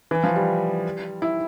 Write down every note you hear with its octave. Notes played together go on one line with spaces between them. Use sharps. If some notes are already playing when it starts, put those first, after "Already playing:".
E3
F3
G3
E4